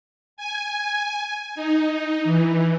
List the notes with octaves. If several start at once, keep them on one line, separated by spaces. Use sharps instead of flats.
G#5
D#4
E3